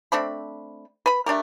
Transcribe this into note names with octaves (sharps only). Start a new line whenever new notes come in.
A3 C4 D4 B5
B4 B5
A3 D4 G4 A#4